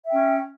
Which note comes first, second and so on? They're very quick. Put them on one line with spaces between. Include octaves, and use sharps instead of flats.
E5 G5 C#4